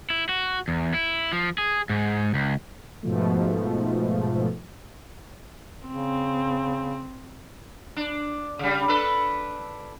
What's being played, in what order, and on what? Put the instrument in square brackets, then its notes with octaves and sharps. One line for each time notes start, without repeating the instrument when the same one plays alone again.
[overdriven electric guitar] E4
F#4
E2
E4
F3
G#4
G#2
C#2
[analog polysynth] G#2 B2 F3 A3
[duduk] C#3 [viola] C4
[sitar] D4
C#3 G3
D4 A4 B4